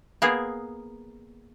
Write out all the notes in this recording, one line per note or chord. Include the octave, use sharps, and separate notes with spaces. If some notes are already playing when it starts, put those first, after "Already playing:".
A#3 B3 G#4